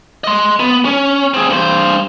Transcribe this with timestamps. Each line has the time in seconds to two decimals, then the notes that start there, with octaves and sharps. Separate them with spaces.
0.24 D#5 C6
0.60 B3
0.85 C#4
1.34 C4 G#4
1.50 G2 C5